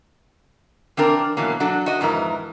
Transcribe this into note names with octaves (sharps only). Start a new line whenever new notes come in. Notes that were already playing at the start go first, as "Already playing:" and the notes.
E3 C4 D4 A#4
B2 E3 F#3 A#3
F#3 D4 F#4 A4
F#4 D#5
F2 G#2 E3 A#4